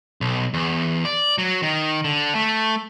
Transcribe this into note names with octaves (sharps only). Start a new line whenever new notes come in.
B1
E2
D5
F#3
D#3
D3
A3